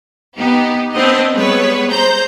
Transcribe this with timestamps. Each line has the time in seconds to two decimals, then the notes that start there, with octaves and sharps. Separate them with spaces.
0.38 B3 D#4 G4
0.95 B3 C4 D4 D#5
1.36 G3 G#3 B3 B4 C#5
1.92 C5 A#5 G6